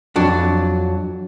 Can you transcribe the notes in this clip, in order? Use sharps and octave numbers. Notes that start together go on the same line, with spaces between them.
F2 F#3 D4